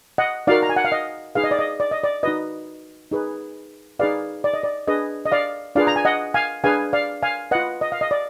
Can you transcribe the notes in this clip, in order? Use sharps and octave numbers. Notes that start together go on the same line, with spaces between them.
D#5 F#5
D#4 F#4 A#4 D5 F5
A#5
G#5
F#5
F5
D#5
D#4 G#4 B4 F5
D#5
D5
D#5
D5
D#5
D5
D#4 F#4 B4 D#5
D#4 G#4 B4
D#4 G#4 B4 D5 F5
D5
D#5
D5
D4 G#4 B4 D#5
D#5
D5 F5
D4 F4 G#4 B4 D5 F5
A#5
G#5
D#5 F#5
F5 G#5
D4 G#4 B4 F5 G#5
D5 F5
F5 G#5
F4 B4 D#5 F#5
D#5
F5
D#5
D5